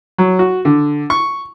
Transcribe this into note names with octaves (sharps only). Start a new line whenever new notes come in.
F#3
F#4
D3
C#6